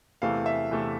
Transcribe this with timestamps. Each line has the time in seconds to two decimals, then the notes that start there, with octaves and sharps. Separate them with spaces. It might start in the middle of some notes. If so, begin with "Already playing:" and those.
0.22 E2 C3 E3 A3 F5
0.46 E5
0.71 E2 C3 E3 A3